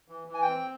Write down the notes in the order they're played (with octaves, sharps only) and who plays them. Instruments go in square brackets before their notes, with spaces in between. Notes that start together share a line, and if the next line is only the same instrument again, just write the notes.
[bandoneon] E3
E3
G#5
G5
C4